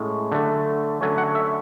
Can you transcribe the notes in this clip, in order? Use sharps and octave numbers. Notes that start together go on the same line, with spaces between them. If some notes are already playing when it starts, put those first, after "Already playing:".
Already playing: A2 G#3 C#4
D3 F#3 A3
D3 F#3 A3 C#4 G#5
F#5
E5